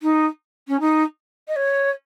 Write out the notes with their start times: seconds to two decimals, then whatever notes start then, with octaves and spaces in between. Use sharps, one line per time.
0.02 D#4
0.68 C#4
0.80 D#4
1.47 D#5
1.56 C#5